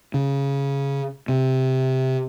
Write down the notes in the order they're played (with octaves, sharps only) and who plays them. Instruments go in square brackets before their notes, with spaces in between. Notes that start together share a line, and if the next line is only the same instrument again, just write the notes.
[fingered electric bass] C#3
C3